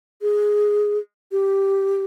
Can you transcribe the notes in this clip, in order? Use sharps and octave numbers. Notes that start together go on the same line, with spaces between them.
G#4
G4